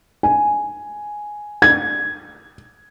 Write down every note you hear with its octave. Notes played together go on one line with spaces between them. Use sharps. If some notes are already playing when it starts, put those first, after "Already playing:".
G#5
G#6